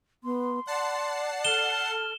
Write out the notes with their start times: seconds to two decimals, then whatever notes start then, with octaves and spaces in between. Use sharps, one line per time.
0.24 B3 C6
0.67 D5 F#5 A5 C7
1.44 A4 F6 E7 G7